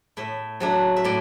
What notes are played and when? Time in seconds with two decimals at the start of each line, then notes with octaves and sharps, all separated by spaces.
0.17 A2 E5
0.60 F#3 A3 D4
0.96 E5
1.04 A2 D5